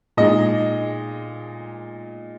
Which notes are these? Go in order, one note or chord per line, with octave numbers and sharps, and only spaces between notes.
A#2 G#3 D#4 D#5